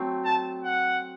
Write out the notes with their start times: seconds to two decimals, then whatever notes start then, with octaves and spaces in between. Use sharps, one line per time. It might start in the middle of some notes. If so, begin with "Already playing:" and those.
Already playing: F#3 A3 C4
0.25 A5
0.64 F#5